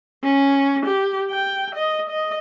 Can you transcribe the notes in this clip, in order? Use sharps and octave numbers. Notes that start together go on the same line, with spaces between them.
C#4
G4
G5
D#5
D#5